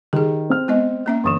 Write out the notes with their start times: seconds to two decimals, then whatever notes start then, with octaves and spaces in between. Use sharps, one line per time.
0.13 D#3 G4 G#4
0.50 C4 F6
0.68 G#3 B3 D#5
1.06 A#3 C#4 E5
1.24 G1 D3 E3 D#6 E7